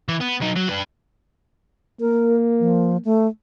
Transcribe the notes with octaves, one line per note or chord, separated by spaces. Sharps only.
E3
B3
F#3 D#4
F#3
D4 B4
A#3 A#4
F3
A3